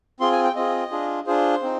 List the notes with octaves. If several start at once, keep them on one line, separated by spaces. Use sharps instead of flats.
C4 F4 G#4 C6
G#5
G5
C4 F4 G#4 D#5
D4 F4 G#4
D4 F4 G#4 C5
C4 D#4